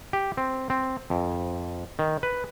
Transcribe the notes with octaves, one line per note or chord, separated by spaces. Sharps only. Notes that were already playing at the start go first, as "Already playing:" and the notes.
G4
C4
C4
F2
D#3
B4